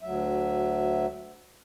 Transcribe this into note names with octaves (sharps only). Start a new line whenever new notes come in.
D2 F#3 E5